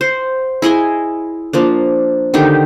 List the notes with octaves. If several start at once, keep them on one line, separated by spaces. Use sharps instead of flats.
C5 F#5
E4 G#4 D#5 G#5
F3 A#3 D4
D3 D#3 D#4 G4